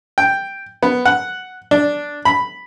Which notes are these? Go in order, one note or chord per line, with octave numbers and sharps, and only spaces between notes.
G5
B3
F#5
D4
B5